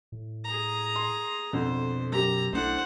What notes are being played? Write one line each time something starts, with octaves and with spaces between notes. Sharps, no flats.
A2
G#4 A#5
C6
F2 B2 D3 C5
F#2 G4 A#5
B1 A3 D4 E4 C5 F#5